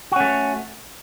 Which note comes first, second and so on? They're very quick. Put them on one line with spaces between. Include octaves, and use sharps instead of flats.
F#4 C#4 A3